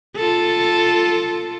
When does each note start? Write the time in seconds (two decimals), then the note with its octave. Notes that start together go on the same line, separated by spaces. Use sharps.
0.16 F4 A4